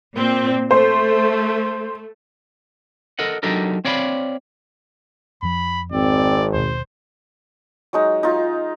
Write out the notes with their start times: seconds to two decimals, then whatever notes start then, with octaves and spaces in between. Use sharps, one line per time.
0.15 A#2 C4
0.71 A3 C5
3.19 A4 A#4 D#5 F#5
3.43 F#3 D4 D#4 G4 A4 A#4
3.85 C4 C#5 D5 F5 A5 B5
5.43 F2 F3 B5
5.92 G#1 C4 D5
6.53 D#2 B2 C5
7.93 F#3 G#3 D#4
8.23 D#4 F4